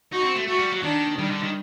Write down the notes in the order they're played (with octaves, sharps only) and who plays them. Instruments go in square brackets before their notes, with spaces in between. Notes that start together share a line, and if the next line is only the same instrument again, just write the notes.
[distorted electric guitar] D#4 [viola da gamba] F#4
[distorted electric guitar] C4
A3
[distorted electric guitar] A3 [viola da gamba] F#4
[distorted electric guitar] G3
F#3
[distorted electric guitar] D#3 [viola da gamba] D4
[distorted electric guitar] D#3 [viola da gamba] G3
[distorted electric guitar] D3
D#3